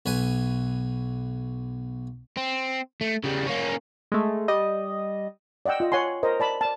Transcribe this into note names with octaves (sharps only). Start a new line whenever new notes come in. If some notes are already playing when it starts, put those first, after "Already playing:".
B1 B4 G#5
C4
A3
C#3 G3
A#3 C#4
G#3 A3
G3 D#5
D5 D#5 F#5 G5 E6
F4 D#5
C#5 F#5 G#5 C6
A#4 C5 D#5
D5 A5 B5
D5 A5